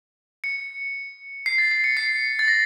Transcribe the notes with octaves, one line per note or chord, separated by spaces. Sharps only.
C#7
C7
A6
C7
C#7
C7
A6
A#6